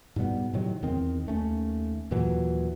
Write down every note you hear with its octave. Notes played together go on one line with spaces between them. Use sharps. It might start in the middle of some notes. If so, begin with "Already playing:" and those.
G#2 B2 G3 B3
A2 C3 D#3 F#3
E2 D#3 C4
D#2 A3 C#4
D#2 A#2 E3 F#3